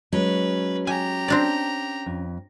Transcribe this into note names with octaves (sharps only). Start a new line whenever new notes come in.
F#3 G#3 C#4 B4
G4 G#5 A#5
C4 D4 D5
F2